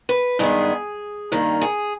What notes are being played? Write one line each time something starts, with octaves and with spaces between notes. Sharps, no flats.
B4
G2 D#3 G#3 B3 G#4
G2 D#3 A#3
G#4